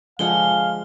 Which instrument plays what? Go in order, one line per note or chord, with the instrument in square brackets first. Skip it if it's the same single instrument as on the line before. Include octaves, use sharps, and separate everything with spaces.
[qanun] D3 F3 F#5 [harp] G#3 [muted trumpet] F5 [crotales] G7